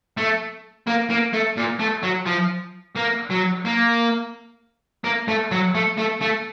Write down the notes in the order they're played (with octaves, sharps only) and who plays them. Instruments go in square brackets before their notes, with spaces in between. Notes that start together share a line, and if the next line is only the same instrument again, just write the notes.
[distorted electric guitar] A3
A#3
A#3
A3
A#2
A3
F#3
F3
A#3
F#3
A#3
A#3
A3
F#3
A3
A3
A3